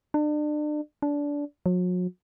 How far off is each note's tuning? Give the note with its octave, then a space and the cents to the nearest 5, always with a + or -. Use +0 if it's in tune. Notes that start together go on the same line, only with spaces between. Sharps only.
D4 +35
D4 -20
F#3 -40